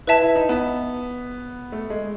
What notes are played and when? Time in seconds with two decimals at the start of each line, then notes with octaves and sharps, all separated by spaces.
0.07 E4 B4 E5 A5
0.22 E4
0.36 D#4
0.49 B3
1.72 A3
1.90 G#3